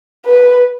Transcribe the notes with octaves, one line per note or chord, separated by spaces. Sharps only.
B4